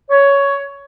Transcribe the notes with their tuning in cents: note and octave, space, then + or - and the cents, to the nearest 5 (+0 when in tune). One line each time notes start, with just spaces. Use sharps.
C#5 +10